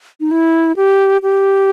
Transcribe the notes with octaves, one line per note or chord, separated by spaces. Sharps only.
D#4
E4
G4
G4